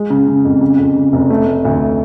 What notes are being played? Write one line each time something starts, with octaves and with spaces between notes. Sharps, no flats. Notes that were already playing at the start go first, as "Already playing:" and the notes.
Already playing: G#3
C#3
C#3
F2
C#3
F2
C#3
F1
A3
A3
D2